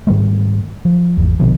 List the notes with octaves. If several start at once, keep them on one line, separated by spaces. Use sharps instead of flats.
G#2 D#3 G3 A3
F3
G#1 E2
A#1 B2 D3 F3